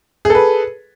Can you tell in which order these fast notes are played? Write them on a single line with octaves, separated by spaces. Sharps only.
G#4 A4 B4